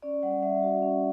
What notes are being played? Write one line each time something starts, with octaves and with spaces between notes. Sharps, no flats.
C#4 D5
G3 F#5
G3 E5
F#4
C#4